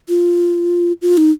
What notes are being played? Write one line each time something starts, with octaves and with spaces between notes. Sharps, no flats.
F4
F4
D#4